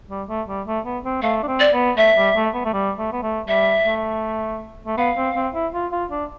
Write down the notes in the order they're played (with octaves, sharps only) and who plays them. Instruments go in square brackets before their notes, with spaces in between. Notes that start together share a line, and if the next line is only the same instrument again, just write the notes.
[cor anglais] G3
A3
G3
A3
B3
C4
[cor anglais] A3 [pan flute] F5
[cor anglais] D4
C4
[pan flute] D5
[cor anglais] B3
[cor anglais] A3 [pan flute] E5
[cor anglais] G3
A3
B3
A3
G3
A3
B3
A3
[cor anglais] G3 [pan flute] E5
[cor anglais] A3
A3
[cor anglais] B3 [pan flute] F5
[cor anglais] C4
C4
E4
F4
F4
D4